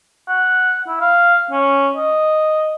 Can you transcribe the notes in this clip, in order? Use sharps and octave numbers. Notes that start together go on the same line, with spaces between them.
F#5
E4
F5
C#4
D#5